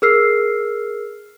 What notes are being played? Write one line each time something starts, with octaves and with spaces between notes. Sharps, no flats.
G#4 A#4 E6 F6 C7